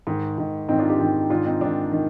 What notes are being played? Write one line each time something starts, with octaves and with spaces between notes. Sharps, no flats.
G#2 D#3
G#2 D#3
G#2 D#3 C4 D#4
D4 F4
D#4 G4
G#2 D#3
G#2 D#3 D4 F4
C4 D#4
G#2 D#3 D4
D#3